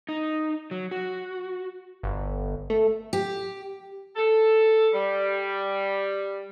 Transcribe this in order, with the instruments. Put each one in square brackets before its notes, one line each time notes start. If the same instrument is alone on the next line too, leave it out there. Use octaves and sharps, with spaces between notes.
[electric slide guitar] D#4
F#3
F#4
[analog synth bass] G1
A3
[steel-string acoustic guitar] G4
[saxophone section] A4
G3